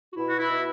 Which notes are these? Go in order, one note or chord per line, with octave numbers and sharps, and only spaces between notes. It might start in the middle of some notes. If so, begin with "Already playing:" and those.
F#4
B2 E4
F#4
E4
B2